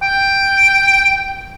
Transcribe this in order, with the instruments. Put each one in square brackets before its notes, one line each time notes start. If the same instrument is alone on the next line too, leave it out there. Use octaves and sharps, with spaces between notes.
[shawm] G5